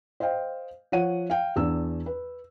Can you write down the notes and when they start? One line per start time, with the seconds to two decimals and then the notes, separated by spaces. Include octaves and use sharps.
0.20 C5 D#5 F5 G5
0.92 F3 C#5 F#5 D#7
1.30 F5 G5
1.56 E2 D4 E6
2.06 B4